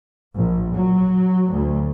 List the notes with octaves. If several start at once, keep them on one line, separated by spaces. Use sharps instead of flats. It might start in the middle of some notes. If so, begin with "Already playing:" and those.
A#1
F#3
D2